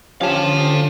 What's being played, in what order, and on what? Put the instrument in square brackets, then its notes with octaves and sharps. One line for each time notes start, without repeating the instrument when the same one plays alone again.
[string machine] D3 [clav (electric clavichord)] F3 C#4 G4 [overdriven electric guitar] F5 A5